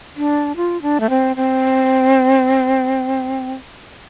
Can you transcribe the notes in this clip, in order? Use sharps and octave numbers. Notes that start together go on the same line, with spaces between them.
D4
F4
D4
A3
C4
C4